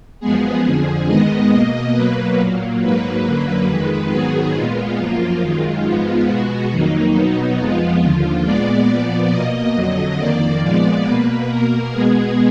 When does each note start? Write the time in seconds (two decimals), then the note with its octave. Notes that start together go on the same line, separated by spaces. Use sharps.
0.20 F#2 F3 G#3 B3 G#4
0.64 F2 D3 F3
1.07 G#2 D#3 G#3 B3 D#5
1.51 B2 A#3
1.94 B2 F#3 A#3 B4
2.37 A#2 F#3 A#3
2.81 G#2 F#3 A#3 B4
3.24 F#2 D3 F#3 A#3
3.68 F2 D#3 G#3
4.10 G#2 D#3 F#3 B3 G#4
4.54 A#2 G#3 B3 F4
4.97 F#2 F3 A#3 F4
5.41 F#2 D#3 G#3 F4
5.85 G#2 F3 G#3 B3
6.28 B2 G#3 B3 F#4
6.71 F2 D#3 F#3 A#3 D#4
7.14 B2 F#3 B3
7.58 F2 F3 G#3 B3 F4
8.01 D#2 D3 F3
8.44 A#2 G#3 B3 D5
8.88 A#2 F3 B3
9.31 B2 A#3 D#5
9.74 F2 D3 F#3
10.18 F2 D#3 A#3 D5
10.62 A#2 F3 G#3 B3
11.04 B2 A#3 B4
11.48 B2 A#3 A#4
11.91 B2 G#3 B3 G#4